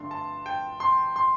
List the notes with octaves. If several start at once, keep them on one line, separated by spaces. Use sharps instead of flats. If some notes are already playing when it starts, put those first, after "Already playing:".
Already playing: G2 D3 A3 D4 C6
A5
G5
C6
C6